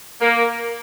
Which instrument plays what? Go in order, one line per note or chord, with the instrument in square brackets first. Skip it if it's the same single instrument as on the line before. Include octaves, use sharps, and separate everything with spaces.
[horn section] A#3